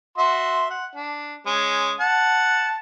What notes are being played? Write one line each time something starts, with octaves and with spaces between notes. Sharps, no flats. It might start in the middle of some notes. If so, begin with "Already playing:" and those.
F#4 E5 C6
F#5
D4
G#3 C#4
F#5 A5